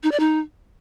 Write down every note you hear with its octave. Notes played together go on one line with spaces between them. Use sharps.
D#4
D5
D#4